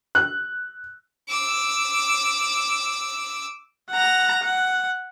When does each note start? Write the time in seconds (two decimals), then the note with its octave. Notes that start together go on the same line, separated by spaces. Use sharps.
0.15 F#6
1.29 D6 E6
3.91 F#5 A#5
4.43 F#5